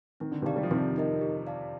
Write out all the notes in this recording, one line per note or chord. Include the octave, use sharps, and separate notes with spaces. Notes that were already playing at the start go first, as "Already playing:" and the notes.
D#3 C4
D3
C3 D#3 G4 D5 F5 A5
G3
F3
C3 D#3 C4
D#4 A#4 D#5
G4
D5 F5 A5